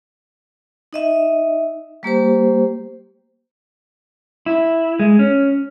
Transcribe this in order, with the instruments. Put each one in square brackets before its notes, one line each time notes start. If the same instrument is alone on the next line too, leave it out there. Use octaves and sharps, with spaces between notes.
[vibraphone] D#4 D#5 E5
G3 A#3 G4 C5
[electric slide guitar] E4
G#3
C#4